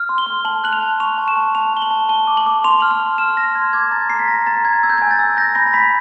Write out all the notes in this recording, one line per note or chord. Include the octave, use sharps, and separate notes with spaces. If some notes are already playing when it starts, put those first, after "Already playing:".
Already playing: F6
C6
G7
C6
A5 F#7
F#6 F#7
F7
A5
C#6 F7
A5
E7
A5
A5 F7
A5 G7
F#7
A5
A5 G7
D6
F#7
D6
C6 F7
F6 F#7
F7
C6
F6 E7
F6 A#6
C6 G#6
D6 G#6
A#5 A6
A#5 C7
B6
A#5 A#6
A#5 A6
A#5 G#6
E6 G#6
G6
G#5 G#6
A6
E6
G6 A#6
B5 A#6
B5 B6